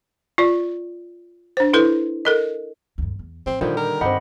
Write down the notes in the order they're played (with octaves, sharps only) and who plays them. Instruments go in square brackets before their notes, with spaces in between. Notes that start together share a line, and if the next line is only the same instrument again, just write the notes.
[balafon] F4 D5
D4 C5
E4 A4 B4
A4 A#4 D#5
[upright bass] D2 G2
E2
[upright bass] A1 F3 [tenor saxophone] C4
[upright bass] A#2 [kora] D3 D#3 G3 [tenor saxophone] F3
[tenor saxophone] A#4
[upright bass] G2 D#4 [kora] C4 G4 [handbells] D#5 F#5 B5